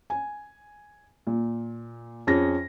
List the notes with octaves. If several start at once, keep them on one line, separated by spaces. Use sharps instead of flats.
G#5
A#2
F2 C#4 G#4 A#6